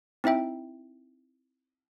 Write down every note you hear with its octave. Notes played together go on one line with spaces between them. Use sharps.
C4 D#4 E4 E5 G5